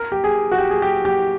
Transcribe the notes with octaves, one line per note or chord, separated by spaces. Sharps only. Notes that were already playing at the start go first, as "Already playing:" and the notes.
Already playing: A#4
G4
G#4
F#4
G4
G#4
G4
G4